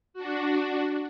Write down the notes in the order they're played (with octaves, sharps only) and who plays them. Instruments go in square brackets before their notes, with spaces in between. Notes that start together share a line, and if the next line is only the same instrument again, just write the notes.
[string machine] D4 F#4